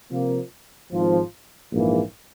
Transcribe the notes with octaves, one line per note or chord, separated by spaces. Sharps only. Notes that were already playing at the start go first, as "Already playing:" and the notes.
C3 F3 A#3
G#1 G#2 F3
A#1 G#2 E3 A#3